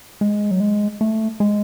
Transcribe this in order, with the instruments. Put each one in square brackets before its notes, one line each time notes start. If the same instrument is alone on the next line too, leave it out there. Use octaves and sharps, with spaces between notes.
[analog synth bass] G#3
F#3
G#3
A3
G#3